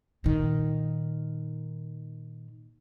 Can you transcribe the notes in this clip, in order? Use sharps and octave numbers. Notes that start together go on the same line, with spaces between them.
A#2 D#3